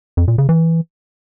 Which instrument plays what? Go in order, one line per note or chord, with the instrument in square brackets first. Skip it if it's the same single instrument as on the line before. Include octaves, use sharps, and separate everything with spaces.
[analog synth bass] F2
A#2
C#3
E3